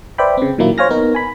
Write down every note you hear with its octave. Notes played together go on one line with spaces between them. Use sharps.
B4 C5 D5 E5 G5 B5
C#3 C4
A#2 D#3 F#3 A#3 E4
C5 C#5 F5 G#5 F6 A#6
B3 D#4 A#4
G#5 B5